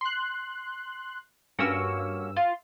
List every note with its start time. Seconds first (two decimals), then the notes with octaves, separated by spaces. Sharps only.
0.01 C6 F#6
1.59 G2 A#3 C#4 F#4 E6
2.37 F4